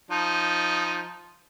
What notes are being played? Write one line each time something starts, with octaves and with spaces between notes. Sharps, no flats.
F3 D#4